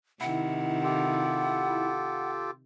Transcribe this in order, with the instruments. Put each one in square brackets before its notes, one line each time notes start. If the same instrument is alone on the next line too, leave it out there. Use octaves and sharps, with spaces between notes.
[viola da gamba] C3 D#3 [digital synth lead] E4 [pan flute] F#5
[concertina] F4 G4 A4